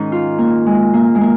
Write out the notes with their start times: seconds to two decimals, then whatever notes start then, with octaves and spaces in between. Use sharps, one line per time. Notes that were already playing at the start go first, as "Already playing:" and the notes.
Already playing: G#2 D#3 C#4 D#4
0.12 F4
0.38 A#3
0.66 G#3
0.94 A#3
1.15 G#3
1.21 A#3